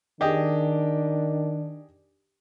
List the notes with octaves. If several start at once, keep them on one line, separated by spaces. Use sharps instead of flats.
D#3 D4 G4 G#4 D#5